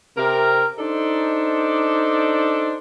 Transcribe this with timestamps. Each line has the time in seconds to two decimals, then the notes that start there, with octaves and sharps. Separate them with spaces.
0.18 C3 A#4
0.79 D4 D#4 A4 C5 D5